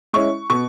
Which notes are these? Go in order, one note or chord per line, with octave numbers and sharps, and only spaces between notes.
G#3 C#4 E4 C#6
B2 C#6